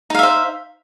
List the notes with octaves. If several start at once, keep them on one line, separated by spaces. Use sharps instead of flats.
D#4 C5 E5 F5